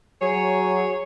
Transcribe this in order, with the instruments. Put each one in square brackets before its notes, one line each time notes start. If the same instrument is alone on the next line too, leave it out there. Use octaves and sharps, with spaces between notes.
[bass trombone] F#3 [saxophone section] G#4 C#5